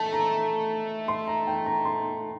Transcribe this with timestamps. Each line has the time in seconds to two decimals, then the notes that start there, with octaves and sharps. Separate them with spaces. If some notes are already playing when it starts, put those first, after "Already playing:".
Already playing: A3 A5
0.13 A#5
1.08 C6
1.28 A#5
1.47 G5
1.66 A#5
1.85 C6